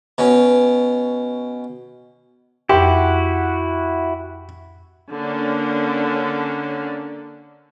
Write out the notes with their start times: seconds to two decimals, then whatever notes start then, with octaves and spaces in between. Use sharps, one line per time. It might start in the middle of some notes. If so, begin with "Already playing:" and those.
0.18 B2 C#4
2.69 F2 E4 F#4 G4 C6
5.10 D3 A#3 C#4 D4